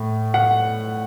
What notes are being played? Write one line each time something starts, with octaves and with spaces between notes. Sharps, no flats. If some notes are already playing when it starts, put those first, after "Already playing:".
Already playing: A2
F#5